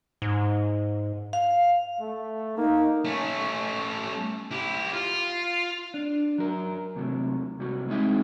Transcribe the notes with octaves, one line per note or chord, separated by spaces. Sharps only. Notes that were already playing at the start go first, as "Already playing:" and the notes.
G#2
F5
A3
A#3 D#4
A3 C#4
E4 G4
F4
D4
F#3 A#4
D#2 C3 F#3 A3
C2 G3 F#4
G#3 C4 D#4 G#4 D#5 E5